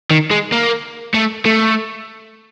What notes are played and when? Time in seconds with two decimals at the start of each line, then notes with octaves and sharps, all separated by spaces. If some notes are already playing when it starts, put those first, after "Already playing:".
0.11 D#3
0.31 G#3
0.52 A#3
1.14 A3
1.45 A3